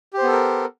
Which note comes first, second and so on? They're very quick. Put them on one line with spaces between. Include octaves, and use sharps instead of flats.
G4 C5 B3 A4 A#4